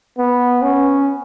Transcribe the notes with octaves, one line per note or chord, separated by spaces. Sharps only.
B3
C#4